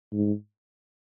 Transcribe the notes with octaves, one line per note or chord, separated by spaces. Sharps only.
G#2